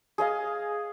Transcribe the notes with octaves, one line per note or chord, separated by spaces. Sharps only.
G#4 D#5 F5